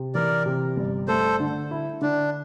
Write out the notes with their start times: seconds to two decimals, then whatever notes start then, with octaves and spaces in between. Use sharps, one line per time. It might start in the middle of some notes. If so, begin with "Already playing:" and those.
Already playing: C3
0.15 E3 A#4 D5
0.46 C3
0.77 G1
1.08 A3 A4 C5
1.40 D3
1.71 E4
2.01 D3 D4